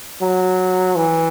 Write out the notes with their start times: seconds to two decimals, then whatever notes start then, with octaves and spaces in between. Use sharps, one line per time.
0.21 F#3
0.96 E3